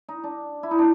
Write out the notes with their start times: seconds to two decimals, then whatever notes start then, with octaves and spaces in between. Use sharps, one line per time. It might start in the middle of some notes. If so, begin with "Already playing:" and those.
0.09 D#4
0.24 D4
0.63 E4
0.71 D#4
0.79 D4